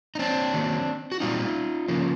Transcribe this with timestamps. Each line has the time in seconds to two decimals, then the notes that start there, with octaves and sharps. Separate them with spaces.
0.15 D#4
0.19 C4 D4
0.53 D#3 F#3 A#3
1.12 F#4
1.20 A#2 G3 C4 D#4 F4
1.88 C#3 F3 A#3